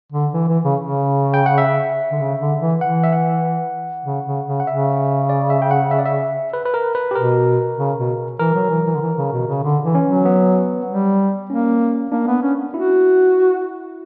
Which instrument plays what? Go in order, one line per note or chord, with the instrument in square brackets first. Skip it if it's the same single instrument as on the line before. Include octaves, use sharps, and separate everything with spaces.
[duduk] D3
E3
E3
C#3
C#3
[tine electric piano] G5
F#5
E5
[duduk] D3
C#3
D3
E3
[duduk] E3 [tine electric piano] F#5
[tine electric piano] E5
F#5
[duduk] C#3
C#3
C#3
[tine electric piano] F#5
[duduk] C#3 [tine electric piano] E5
[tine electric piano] D5
E5
G5
F#5
E5
D5
E5
B4
B4
A#4
B4
G4
[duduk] B2 [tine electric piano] A#4
[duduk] C#3
B2
[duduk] E3 [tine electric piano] A#4
[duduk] F#3
E3
E3
D3
E3
C#3
B2
C#3
D3
E3
[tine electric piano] C#4
[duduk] F#3
[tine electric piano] B3
[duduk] G3
[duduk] A#3 [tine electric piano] C#4
[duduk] A#3 [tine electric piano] D4
[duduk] B3
C#4
[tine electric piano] E4 [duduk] F#4